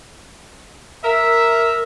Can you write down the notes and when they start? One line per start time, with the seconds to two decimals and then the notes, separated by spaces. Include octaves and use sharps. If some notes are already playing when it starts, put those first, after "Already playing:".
1.04 A#4 E5